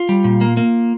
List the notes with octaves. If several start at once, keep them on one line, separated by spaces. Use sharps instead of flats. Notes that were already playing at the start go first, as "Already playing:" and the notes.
Already playing: F4
G3
A#2
A#3
A#3